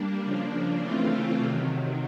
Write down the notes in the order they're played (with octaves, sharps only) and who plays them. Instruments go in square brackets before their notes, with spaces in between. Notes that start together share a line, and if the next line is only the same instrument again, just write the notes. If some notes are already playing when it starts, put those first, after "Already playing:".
Already playing: [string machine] G3 A#3 D4
C#3 F3 A#3 D4
C#3 E3 A3 C4 F4
C3 D#3 F#3